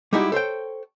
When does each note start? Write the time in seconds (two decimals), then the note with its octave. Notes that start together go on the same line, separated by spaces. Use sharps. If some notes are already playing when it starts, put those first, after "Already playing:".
0.13 G3 G#3 D#4 E4 F#4 G4
0.32 A4 C5 C#5 G5